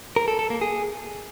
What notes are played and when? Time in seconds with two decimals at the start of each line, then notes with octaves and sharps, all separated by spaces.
0.16 A#4
0.28 A4
0.39 A4
0.50 A#3
0.61 G#4